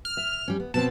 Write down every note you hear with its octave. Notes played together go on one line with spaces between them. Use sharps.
F6
E5
G3 C#4
B3
B2 B3 C4 A5